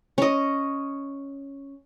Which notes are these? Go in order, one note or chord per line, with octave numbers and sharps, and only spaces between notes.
C#4 D#5